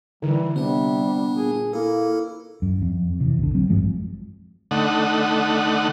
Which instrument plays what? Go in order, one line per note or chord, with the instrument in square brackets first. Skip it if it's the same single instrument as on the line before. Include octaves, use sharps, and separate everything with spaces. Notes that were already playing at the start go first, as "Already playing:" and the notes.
[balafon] D3 [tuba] E3 [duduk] G3
[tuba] C3 [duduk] G3 [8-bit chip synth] B3 D4
[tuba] A#2 [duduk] G#4
[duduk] A#3 [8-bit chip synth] E4 A4
[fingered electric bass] F#2
F2
F2 C3 E3
B1 D3
F#3 C4
G#1 F#2 F3 G#3
[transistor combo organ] D3 A3 D#4 F#5